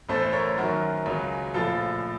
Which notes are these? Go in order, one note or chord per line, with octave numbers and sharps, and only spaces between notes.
A1 A2 A3 A4 C5
A#4 C#5
F#2 D#3 F#3 F#4 A#4
C#2 C#3 F#3
A#1 A2 F3 F4 A4